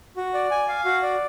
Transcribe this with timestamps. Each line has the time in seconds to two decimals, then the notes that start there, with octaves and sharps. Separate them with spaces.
0.17 F#4
0.34 D5
0.51 G#5
0.68 F5
0.85 F#4
1.03 D5